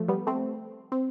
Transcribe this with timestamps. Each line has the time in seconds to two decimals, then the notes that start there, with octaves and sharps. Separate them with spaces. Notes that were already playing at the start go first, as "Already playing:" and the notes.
Already playing: F3 A3
0.08 G3 B3
0.27 A3 C4
0.92 C4